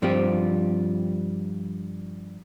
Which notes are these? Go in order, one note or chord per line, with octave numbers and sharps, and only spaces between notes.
G2 F3 G3 C4 F4 G4